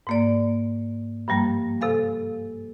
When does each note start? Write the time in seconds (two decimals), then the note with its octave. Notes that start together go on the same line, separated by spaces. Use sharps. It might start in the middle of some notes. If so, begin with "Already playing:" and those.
0.07 G#2 A#3 D5
1.28 G2 F3 G3 A#3
1.81 C3 A4 F5 G#5